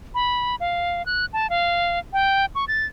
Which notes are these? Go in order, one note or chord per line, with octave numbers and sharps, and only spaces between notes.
B5
F5
F#6
A5
F5
G5
C#6
A6